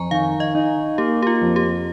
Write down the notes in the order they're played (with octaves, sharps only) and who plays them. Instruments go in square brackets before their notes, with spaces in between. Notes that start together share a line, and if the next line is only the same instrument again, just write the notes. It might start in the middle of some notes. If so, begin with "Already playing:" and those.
Already playing: [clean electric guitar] F2 [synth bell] G#5 A#5 C#6
[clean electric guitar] D#3 [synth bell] F5
[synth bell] D#5
[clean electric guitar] D#4
[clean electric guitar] A#3 [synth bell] G4
[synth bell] G4
F4
[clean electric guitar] F2
[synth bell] G4